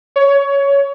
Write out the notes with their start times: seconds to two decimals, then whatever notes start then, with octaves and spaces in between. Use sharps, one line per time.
0.16 C#5